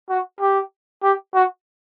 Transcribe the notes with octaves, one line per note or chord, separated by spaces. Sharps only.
F#4
G4
G4
F#4